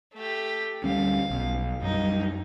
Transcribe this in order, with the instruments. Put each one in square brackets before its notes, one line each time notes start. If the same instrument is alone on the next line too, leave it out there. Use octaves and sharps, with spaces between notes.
[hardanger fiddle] A3 G4
[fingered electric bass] D2 G3 C#4 [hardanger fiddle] F5
[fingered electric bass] B1
[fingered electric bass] F#2 G3 [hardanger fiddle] D#4